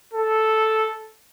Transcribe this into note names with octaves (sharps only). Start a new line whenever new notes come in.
A4